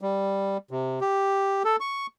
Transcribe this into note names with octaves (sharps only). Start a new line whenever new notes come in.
G3
C3
G4
A4
C#6